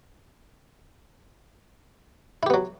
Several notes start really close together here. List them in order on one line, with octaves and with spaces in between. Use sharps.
E4 G4 B3 F#3